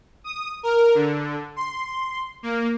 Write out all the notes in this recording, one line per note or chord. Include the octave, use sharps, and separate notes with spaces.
D#6
A#4
D3
C6
A#3